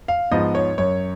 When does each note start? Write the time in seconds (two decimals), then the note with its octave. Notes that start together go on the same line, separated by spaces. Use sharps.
0.08 F5
0.31 G#2 F3 B3 D#5
0.55 C#5
0.78 F#2 C#5